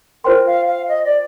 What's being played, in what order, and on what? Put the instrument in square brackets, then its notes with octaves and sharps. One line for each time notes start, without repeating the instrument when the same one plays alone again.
[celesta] F4 C5 G5 C6 [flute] A#4
[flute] F5
F5
D#5
D5